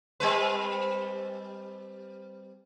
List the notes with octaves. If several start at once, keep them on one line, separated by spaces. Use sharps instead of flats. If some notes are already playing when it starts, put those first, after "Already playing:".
G3 C4 B4